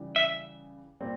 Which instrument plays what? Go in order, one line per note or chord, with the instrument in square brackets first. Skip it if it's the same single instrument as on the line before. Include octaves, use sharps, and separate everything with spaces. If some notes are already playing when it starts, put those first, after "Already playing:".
Already playing: [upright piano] C#3 E3 G3
[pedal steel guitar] E5
[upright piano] A#2 G3 C4